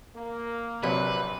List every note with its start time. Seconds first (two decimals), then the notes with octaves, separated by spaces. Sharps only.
0.16 A#3
0.83 A#1 C3 F#3 B4